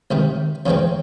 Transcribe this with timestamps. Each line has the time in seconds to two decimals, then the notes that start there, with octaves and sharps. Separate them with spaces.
0.11 C#2 C3 D#3
0.66 F2 C#3 E3 G#3 C4